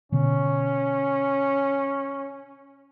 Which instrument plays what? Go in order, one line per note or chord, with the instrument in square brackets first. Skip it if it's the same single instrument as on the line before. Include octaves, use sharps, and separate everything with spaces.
[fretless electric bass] B2 D3 B3 [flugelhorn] C#4